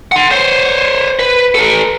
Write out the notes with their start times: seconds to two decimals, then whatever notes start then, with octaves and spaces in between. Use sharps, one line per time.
0.12 F#5 C6
0.31 C5 C#5
1.19 B4
1.55 A4 B4